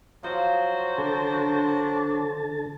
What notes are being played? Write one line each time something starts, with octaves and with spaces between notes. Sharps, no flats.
F3 F#3 F#4 C5 D#5
D3 D4 A4 A5